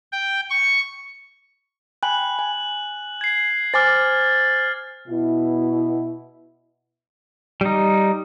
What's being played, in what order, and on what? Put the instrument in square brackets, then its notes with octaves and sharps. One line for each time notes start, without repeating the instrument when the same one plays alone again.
[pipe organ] G5
C#6
[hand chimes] G5 G#5 B5 [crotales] F#6 F#7
[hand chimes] G#5
[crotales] G#6 C7
[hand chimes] C5 G#5 D6 [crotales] F6 A6
[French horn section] B2 E4
[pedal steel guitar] G3 D#4